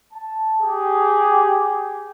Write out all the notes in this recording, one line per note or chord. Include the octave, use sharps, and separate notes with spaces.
A5
G4 G#4